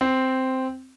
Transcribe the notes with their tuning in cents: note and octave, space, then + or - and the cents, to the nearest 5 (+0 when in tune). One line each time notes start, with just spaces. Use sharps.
C4 -5